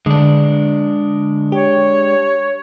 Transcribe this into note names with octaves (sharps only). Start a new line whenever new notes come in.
D3 G#3 D4
G4 C#5